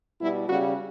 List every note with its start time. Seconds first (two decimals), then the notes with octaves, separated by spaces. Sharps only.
0.19 B2 G3 E4
0.48 C#3 G3 F#4